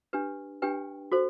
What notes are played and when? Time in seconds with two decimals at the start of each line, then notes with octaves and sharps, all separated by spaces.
0.13 D4 G4 B4
0.62 D4 G4 B4 G5
1.12 F#4 A4 C5